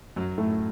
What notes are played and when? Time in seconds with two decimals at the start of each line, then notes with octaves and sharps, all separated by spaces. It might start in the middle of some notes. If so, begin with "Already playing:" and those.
0.16 F#2 F#3
0.38 A2 A3